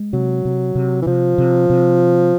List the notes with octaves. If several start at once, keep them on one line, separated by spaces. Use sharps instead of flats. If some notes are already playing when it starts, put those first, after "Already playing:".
Already playing: G#3
C3 F#3
C3
C3
E3
C3 F3
C3
C3